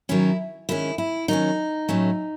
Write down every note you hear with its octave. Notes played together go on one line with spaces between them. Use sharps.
D#3 F#3 C#4 E4
D#3 G#3 C#4 E4
E4
D#3 F#3 A3 C#4 D#4
A2 F#3 A3 C#4